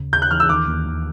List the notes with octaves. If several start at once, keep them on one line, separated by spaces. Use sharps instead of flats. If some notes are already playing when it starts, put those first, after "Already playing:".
Already playing: D#2 C#3
D#2 G6
F#6
E3 F6
E6
D#3 D6
D#2
D#2